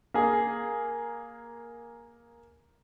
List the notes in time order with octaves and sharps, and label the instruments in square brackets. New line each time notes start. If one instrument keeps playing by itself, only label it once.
[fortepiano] A#3 G#4